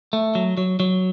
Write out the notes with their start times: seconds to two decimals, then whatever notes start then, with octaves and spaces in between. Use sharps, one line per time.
0.13 A3
0.35 F#3
0.58 F#3
0.80 F#3